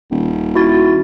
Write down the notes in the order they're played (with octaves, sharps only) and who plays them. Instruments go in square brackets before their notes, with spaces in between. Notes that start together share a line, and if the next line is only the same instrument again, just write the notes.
[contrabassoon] D#1
[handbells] E4 F#4 A6